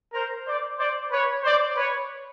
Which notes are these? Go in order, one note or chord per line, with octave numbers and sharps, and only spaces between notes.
A#4 C5
C5 D5
C5 D5
B4 C#5
C5 D5
B4 C#5